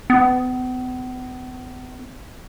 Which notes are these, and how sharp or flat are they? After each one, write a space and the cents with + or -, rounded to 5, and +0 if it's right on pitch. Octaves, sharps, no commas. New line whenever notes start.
B3 +40